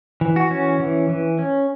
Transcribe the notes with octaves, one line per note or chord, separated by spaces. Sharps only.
E3
F#4
C#4
E3
E3
C#4